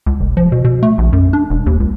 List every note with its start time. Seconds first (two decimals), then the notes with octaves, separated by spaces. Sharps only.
0.06 C#2
0.20 F1
0.37 F3
0.52 B2
0.65 B2
0.83 A3
0.98 A#1
1.13 F#2
1.33 D4
1.50 E1
1.66 D#2
1.80 C#2